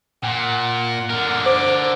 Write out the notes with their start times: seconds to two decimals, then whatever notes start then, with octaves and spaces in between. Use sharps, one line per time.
0.24 A#2 F#5
1.10 D3 A#4
1.46 C5 D6